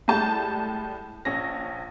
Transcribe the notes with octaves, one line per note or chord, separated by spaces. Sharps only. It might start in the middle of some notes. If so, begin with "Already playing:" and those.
A2 G3 G#3 A5 G6
A#1 C#4 A#6